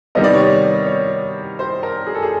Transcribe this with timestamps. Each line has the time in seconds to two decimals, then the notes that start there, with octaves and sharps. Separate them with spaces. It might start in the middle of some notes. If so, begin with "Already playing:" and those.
0.15 C3 D#3 G3 B3 D#5
0.24 D5
0.33 C#5
0.43 D5
0.86 C#5
1.59 C5
1.83 A#4
2.07 G#4
2.15 A4
2.22 G#4